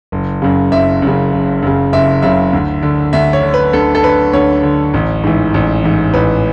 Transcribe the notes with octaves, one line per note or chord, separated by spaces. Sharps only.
F#1
F#2 C#3
F#1 E5
F#2 C#3
F#1
F#2 C#3
F#1 E5
F#2 C#3 E5
D2
D3
D2 E5
C#5
D3
B4
D2 A4
A4
D3 B4
D2 C#5
D3
A1
G#2 E3
A1
G#2 E3
A1 B4